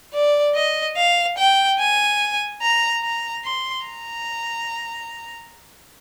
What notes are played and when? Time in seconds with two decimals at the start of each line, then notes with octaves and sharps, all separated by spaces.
0.14 D5
0.55 D#5
0.97 F5
1.38 G5
1.79 G#5
2.62 A#5
3.03 A#5
3.45 C6
3.86 A#5